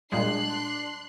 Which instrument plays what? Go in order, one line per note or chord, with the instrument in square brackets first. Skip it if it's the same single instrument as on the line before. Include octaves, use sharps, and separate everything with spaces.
[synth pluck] A#2 G3 G#3 [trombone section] D4 [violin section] C6 F#6 C7